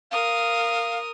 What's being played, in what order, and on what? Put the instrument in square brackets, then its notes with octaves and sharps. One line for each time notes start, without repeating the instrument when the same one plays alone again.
[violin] A#4 D#6 [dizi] F5